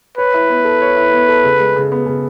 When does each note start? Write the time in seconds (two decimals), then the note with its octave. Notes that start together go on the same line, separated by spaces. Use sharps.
0.18 B4 C#5
0.34 E4
0.50 B3
0.65 A4
0.82 C#5
0.96 E4
1.12 B3
1.28 A4
1.44 C#3
1.60 G#3
1.76 C#3
1.92 B3
2.06 C#3